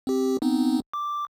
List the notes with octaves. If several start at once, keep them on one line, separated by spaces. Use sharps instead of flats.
C4 G4
B3 C4 D#4
D6